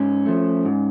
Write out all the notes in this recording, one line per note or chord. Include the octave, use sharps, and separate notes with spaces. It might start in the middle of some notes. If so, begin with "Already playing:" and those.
Already playing: G#2 C#4
F3 A3
G#2